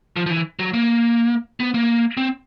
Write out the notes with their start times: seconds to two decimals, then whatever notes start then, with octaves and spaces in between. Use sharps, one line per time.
0.16 F3
0.26 F3
0.30 E3
0.59 F#3
0.74 A#3
1.60 B3
1.74 A#3
2.17 C4